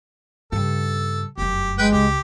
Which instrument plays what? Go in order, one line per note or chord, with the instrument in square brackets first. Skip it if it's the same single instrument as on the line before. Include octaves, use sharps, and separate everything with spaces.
[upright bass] G2 C#3 [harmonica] A4
[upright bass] F1 F#2 [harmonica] G4
[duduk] G#3 [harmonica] B4 G5
[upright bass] C#2 [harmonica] G4